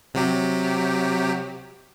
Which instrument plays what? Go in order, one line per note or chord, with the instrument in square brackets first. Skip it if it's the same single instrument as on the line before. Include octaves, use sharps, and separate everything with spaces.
[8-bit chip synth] C3 F#3 G4